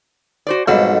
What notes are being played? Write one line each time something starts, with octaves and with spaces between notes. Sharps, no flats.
F#4 C5 D5
B1 F2 G#2 G3 F#4 A4